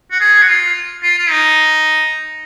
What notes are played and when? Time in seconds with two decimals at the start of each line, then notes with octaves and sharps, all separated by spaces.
0.11 F#4
0.20 G#4
0.42 F#4
0.48 F4
1.03 F4
1.18 F4
1.30 D#4